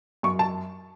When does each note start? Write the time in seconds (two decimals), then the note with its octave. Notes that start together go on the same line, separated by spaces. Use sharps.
0.23 F#2 C#6
0.39 A5